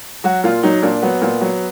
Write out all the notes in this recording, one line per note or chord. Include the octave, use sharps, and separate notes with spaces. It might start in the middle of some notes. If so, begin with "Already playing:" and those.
F#3 F#4
A#2 F4
F#3 D#4
A#2 D4
F#3 B3
A#2
F#3